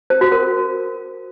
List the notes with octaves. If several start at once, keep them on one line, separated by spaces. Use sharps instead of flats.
C5
F#4
A#4